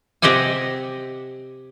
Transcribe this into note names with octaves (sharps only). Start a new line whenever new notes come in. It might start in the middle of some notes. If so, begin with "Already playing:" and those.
C3 C4 G4 D#5 F#5 G#5